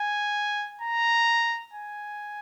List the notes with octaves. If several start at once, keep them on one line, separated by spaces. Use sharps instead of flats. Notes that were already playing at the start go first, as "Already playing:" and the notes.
Already playing: G#5
A#5
G#5